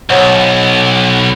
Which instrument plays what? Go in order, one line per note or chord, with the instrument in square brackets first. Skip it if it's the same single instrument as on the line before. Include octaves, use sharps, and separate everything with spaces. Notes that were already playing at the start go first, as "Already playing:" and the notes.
[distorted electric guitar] B1 [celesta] C5 C#5 F#5